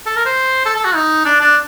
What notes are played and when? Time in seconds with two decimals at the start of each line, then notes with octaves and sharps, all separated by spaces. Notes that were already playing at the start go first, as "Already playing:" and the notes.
0.06 A4
0.16 A#4
0.26 C5
0.65 A4
0.76 A4
0.85 F#4
0.95 D#4
1.25 D4
1.40 D4